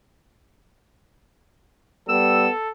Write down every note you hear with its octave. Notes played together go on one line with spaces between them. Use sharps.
G3 B3 A4 E6